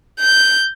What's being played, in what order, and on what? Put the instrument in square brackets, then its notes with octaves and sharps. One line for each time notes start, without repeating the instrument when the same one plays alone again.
[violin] G6